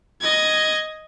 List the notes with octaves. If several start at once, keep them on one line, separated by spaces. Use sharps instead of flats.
D#5 G#6